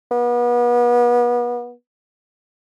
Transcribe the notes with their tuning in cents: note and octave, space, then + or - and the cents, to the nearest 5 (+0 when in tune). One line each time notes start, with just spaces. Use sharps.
B3 -35